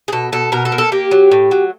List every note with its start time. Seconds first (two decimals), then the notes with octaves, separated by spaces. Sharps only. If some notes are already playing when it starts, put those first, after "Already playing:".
0.08 G#4
0.12 B2 A4
0.32 B2 A4
0.52 B2 A#4
0.65 A4
0.72 A#3
0.78 A4
0.92 A#3 G4
1.11 F#3
1.31 A2
1.51 F#3